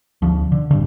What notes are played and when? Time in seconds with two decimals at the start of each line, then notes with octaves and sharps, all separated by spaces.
0.22 D2 F3
0.52 D3
0.71 A1 G2 D3